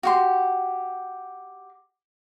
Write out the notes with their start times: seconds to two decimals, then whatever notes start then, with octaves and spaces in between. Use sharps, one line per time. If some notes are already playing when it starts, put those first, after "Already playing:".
0.03 F#4 G4 C6